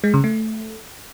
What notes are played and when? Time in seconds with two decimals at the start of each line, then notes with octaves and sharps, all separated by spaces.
0.04 G#3
0.14 C#3
0.24 A3